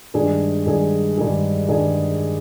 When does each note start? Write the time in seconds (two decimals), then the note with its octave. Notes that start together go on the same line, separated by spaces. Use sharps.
0.14 G2 D#3 G#3 D4 G#4
0.66 G2 D#3 G#3 D4 G#4
1.17 G2 D#3 G#3 D4 G#4
1.68 G2 D#3 G#3 D4 G#4